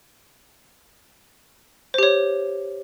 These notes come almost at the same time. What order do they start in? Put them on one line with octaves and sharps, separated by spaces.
C5 G4 C#5